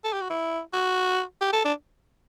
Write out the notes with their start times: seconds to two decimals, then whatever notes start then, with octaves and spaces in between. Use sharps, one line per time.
0.04 A4
0.13 G4
0.22 F#4
0.30 E4
0.73 F#4
1.41 G4
1.53 A4
1.64 D4